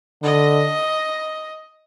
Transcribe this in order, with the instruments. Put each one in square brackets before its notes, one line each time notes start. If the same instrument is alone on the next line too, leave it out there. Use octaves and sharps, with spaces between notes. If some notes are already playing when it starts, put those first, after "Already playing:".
[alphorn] D3 [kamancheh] D#5